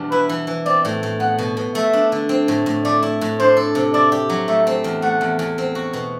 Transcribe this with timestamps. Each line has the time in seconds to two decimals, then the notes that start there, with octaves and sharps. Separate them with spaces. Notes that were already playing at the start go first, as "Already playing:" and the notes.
Already playing: E2 B2 G3 D4
0.11 E4 B4
0.29 E3
0.47 E3
0.66 C4 D5
0.85 A2
1.03 A2
1.20 B3 F#5
1.39 B2
1.57 B2
1.75 A3 E5
1.93 D4
2.12 D3
2.29 C4
2.48 A2
2.66 A2
2.85 A3 D5
3.03 E4
3.21 A2
3.40 D4 C5
3.57 A4
3.75 C3
3.94 E4 D5
4.12 G4
4.29 F#3
4.48 A3 E5
4.67 C4
4.84 E2
5.02 A3 F#5
5.21 E2
5.39 E2
5.58 C4
5.75 F#4
5.93 B2